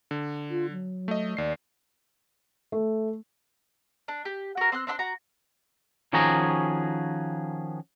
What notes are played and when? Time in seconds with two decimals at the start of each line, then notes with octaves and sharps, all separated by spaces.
0.11 D3
0.50 F4
0.71 F#3
1.08 A3 D#5
1.37 D#2 D5 C7
2.72 A3
4.08 D4
4.25 G4
4.57 F#4 A#4
4.72 C4 C6 F#6
4.87 C4 D4 E5 C6
4.99 F#4 A#5
6.13 D#3 F3 C#4 F#4 G#4 A#5